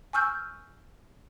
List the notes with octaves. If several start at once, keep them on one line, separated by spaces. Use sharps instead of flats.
G#5 C#6 E6 F6 G6